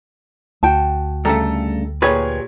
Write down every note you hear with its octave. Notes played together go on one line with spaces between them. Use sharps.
D2 F#4 G5 A5
G2 C#3 A3 A4 A#5
A#2 G4 G#4 B4 C#5 G#6